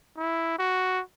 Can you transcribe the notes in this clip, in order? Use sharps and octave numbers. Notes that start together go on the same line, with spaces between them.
E4
F#4